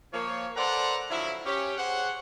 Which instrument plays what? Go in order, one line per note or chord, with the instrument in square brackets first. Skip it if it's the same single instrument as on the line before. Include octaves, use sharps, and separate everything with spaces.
[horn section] F3 A#3 C#5
A4 B4 C5 D5 F#5 A#5
D3 F3 F#3 E4
C#4 G4
G#4 C5 C#5 F#5